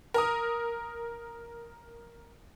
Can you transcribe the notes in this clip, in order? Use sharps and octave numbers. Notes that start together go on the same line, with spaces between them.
A#4 A#5 D#6